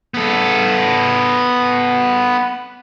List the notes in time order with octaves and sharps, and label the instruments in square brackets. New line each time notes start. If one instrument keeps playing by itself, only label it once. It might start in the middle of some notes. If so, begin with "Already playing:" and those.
[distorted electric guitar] B3 A4